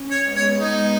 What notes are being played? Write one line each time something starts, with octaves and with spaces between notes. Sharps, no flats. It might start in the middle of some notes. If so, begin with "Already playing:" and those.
Already playing: C#4
C#5
G#3 B3
C#5
G#3 B3 D#4